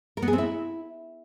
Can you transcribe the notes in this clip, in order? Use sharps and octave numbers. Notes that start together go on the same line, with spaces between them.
A#4
B3
G#4
C4
E4